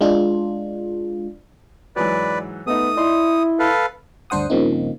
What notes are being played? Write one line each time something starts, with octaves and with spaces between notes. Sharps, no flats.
G#3 D4 F4
G#2 E3 F#3 B4 D5
A3 B3 D#4 D#6
E4 D5 D#5 C6
A4 B4 F5
D2 G2 D4 C5 F#5 D#6
G2 C#3 F3 A#3 C4 D#4